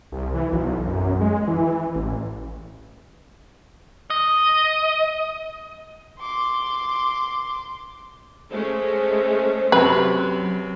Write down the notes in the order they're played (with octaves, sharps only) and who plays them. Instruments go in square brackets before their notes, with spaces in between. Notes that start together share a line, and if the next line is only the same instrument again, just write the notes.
[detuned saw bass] C2
E3
B1
F#2
G#3
E3
A1
[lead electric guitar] D#5
[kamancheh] C6 D6
[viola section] G#3 A3 C#4 [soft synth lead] C5
[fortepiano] F#2 C3 [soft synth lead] F#3 [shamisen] B4